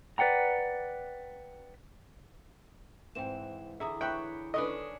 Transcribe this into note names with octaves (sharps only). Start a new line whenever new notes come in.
B4 D5 F#5 G5 A#5
G#2 E3 C4 G5 E7
D3 E3 G#4 E5 A#5 D#6
B4 C#5 E5 G5
D#3 C#4 D4 A4 B4 D#5 D#6